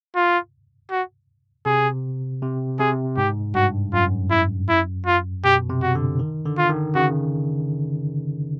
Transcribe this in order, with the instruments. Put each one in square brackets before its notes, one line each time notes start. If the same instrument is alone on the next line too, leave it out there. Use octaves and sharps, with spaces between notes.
[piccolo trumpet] F4
F#4
[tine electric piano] C3 [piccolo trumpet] G#4
[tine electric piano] C3
[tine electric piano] C3 [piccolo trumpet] G#4
[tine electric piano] G#2 [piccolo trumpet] G4
[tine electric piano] G2 [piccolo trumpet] F#4
[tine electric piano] F#2 [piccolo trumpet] F4
[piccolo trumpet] E4
E4
F4
[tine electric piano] B2 [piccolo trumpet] G4
[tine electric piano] C3
[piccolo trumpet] F#4
[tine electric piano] D3
D#3
D3
[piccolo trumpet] F4
[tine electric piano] D#3
[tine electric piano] C#3 [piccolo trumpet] F#4